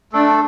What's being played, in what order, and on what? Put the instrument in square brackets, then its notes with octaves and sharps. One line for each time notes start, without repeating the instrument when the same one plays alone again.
[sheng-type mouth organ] A3 A4 [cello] D4